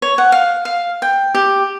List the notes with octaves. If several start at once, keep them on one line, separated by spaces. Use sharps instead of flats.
C#5
F#5
F5
F5
G5
G4